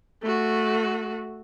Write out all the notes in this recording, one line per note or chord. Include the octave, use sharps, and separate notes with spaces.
A3 F#4